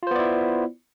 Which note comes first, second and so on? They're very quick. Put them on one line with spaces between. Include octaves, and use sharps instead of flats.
F4 C5 B3 D5 E4